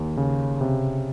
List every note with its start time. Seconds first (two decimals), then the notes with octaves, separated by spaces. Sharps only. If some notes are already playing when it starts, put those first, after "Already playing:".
Already playing: D#2
0.17 C#3
0.61 C3